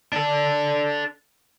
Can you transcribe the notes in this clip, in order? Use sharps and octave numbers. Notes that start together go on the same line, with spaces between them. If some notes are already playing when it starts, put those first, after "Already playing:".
D4 A4